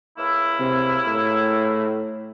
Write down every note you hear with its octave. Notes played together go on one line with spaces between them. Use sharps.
C#2 A#3 E4
C3
A2